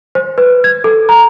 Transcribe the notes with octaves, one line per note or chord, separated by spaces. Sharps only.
C5
B4
G#6
A4
A#5